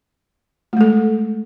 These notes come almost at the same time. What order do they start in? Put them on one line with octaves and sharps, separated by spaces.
A3 G#3 A4